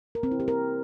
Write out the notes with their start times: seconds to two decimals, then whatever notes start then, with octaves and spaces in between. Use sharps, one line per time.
0.15 A#4
0.23 C4
0.31 E4
0.40 G4
0.48 A#4